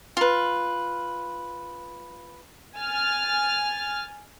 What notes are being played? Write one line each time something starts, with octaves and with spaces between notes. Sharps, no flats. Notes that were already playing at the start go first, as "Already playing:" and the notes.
F4 B4
G#5 F6 A6